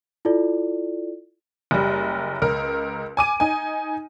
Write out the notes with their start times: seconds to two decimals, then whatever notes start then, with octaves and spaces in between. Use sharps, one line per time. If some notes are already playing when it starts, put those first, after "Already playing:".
0.25 E4 F4 A4 D5
1.71 F#1 G3
2.42 C#2 A#4
3.17 G#5 D6 D#7
3.40 D#4 G#5